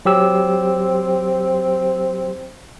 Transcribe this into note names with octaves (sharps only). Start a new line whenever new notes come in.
F#3 C4 G4 E6